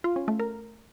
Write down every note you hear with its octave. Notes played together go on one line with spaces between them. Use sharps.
F4
C#4
A3
A#4